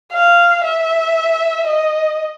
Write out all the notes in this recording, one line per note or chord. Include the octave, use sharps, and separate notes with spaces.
F5
E5
D#5